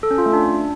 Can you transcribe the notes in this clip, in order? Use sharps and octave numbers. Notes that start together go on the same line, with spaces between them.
A4
C#4
F4
A3
D4